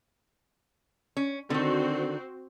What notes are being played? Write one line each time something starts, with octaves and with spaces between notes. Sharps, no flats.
C#4
D3 D#3 C4 F#4